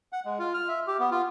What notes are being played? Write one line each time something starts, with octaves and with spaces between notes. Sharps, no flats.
F#5
G#3
F4
F6
E5
G4
B3
F4